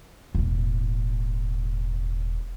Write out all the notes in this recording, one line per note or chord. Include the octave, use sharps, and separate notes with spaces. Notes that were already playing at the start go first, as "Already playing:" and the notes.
E1 A2